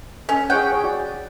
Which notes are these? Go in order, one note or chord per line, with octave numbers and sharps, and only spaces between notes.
C#4 A4
G#4 C#5 F#5 G5
G#4 C#5
F#4 D5